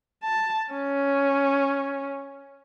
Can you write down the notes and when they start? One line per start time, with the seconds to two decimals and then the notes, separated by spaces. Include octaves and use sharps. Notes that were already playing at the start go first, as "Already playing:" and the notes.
0.24 A5
0.73 C#4